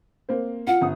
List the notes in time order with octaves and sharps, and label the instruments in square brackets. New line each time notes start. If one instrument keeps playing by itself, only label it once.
[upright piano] A#3 C4 C5
[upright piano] F4 [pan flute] F#5
[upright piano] G1 D#6